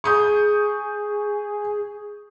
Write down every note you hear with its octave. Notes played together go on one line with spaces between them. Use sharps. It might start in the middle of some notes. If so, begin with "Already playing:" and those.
G#4 C#6 D#6 G6